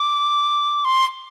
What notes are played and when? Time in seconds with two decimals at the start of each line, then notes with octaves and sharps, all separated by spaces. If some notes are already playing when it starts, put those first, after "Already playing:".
Already playing: D6
0.85 C6